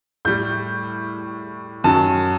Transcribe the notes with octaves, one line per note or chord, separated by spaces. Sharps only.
A2 G3 G6
F#2 D#3 F#3 A5